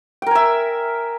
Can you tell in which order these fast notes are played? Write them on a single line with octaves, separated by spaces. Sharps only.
G5 A#4 G#5 E5